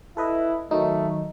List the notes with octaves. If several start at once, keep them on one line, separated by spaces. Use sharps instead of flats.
E4 A4 B4 D#5
D#3 F#3 A3 D#4